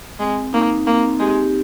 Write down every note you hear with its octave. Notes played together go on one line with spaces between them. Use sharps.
G#3 C4
A#3 D#4
A#3 C4
G#3 G4